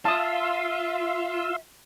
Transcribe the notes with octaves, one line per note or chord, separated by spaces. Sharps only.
F4 E5 F5 A5 C6 D#6 E6